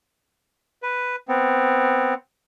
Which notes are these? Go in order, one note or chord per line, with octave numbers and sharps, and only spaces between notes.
B4
B3 C4